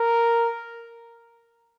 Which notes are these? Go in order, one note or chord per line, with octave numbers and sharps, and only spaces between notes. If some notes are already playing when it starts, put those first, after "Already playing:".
Already playing: A#4